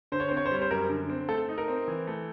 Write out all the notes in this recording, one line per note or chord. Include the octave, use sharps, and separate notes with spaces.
D3 C5
C#5
C4 C5
C#5
C5
G3 C#5
C5
F#2 A#4
D3
C4
A3 A4
D#4
A#4
C4
E3
A3